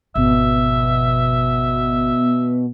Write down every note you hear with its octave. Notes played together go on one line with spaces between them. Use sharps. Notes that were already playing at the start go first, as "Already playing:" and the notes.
G#1 F2 B2 E5